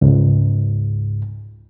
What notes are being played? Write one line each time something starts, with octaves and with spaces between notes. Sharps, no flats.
C#2 G#2